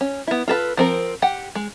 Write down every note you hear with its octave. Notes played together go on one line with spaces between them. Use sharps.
C#4
B3 E4
F4 A4 B4
F3 C4 A#4
G4 F#5 G5
G#3